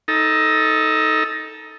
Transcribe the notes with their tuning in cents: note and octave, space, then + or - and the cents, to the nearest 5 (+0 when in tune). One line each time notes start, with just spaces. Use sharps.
D#4 +15 A4 +0